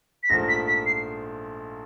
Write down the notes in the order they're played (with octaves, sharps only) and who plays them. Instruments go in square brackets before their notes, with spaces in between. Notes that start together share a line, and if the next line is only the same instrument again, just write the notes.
[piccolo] B6
[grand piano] A#1 G#2 F3 A3 [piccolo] A#6
[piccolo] B6
B6
C7